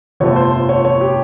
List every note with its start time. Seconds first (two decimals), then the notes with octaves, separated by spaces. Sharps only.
0.20 G1 F2 C3 F3 A3 C#5
0.36 C5
0.53 C5
0.69 C#5
0.85 C#5
1.01 G4